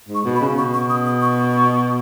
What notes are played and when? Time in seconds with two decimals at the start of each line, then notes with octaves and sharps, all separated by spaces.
0.09 G#2
0.15 C#6
0.25 B2
0.36 B5
0.41 C#3
0.57 B2 C#6
0.74 C#6
0.90 D#6
1.06 D#6
1.22 C#6